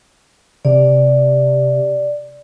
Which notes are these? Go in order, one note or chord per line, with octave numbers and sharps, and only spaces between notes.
C3 D5